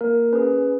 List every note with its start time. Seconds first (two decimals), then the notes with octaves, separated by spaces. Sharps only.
0.01 A#3 A#4
0.33 C#4 G#4 B4